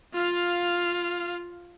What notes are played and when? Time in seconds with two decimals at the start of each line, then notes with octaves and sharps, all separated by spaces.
0.14 F4 F5